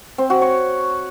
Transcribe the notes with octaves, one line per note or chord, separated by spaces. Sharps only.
C4
F#4
C#5